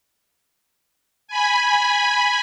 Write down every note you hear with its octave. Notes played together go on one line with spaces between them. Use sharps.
G#5 B5